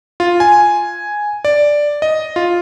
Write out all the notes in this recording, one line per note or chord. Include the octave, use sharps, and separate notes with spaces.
F4
G#5
D5
D#5
F4